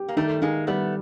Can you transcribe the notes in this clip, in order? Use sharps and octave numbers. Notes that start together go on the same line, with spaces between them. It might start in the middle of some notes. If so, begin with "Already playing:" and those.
Already playing: G4
A#3
D#3 G3 A3
D#3 G#3 A#3
G3 A3 B3